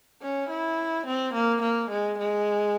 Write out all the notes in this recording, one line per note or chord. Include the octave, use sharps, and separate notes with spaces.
C#4
E4
C4
A#3
A#3
G#3
G#3